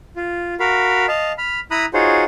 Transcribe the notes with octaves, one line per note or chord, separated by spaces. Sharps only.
F4
F#4 A#4 F5 B5
D#5 F5 A5
B5 F6
E4 A#5 B5 D#6 F#6
D#4 F4 F#4 G#4 C5 C#5